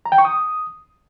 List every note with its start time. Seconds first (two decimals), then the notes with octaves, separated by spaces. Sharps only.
0.06 A#5
0.12 G5
0.18 C#6
0.25 D#6